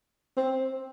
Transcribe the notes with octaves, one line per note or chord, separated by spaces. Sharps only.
C4